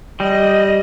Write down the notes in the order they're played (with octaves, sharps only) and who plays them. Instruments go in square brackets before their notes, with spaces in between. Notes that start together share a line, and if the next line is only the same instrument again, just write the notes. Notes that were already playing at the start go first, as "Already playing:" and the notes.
[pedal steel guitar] G3 [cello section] D#5